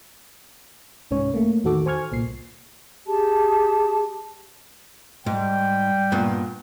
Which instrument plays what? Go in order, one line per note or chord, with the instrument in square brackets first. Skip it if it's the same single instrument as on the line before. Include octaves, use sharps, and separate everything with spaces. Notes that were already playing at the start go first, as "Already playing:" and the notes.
[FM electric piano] C2 G#2 C#4 C#5
A3 A#3
E2 A2 D#3 F#4 A4 D6
C5 G#5 C#6 F6 G#6
C2 A#2 C7
[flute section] G4 G#4 A5
[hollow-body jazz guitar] G#2 [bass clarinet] G3 [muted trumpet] G5
[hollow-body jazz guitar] G2 A#2 B3